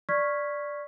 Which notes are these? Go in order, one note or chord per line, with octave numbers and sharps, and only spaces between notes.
D5 C#6 F6 G#6 B6